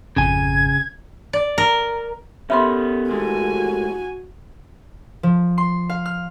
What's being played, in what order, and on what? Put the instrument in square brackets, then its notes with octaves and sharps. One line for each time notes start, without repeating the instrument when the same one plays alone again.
[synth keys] G#1 F2 [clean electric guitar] C#3 G#5 [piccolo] G#6
[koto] D5
A#4
[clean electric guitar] B3 C#4 [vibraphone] G4 A4 A#4 [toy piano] E5 B5 C6
[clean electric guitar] A2 G#3 [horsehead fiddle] F#4 G#5
[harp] F3
C6
F5
F6